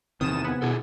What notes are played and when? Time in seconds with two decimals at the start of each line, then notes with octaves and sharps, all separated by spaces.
0.21 E2 C3 D#3 E3 C4 D#6 A6 E7
0.44 B3 G#5
0.62 B2 E4 G#4 A4